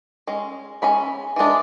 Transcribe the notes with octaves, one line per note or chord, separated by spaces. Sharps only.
G#3 C#4
G#3 C#4 B5
E3 G#3 D4